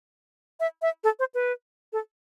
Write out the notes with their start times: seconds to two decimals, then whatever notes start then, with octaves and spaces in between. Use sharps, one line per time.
0.60 E5
0.82 E5
1.04 A4
1.19 C5
1.34 B4
1.93 A4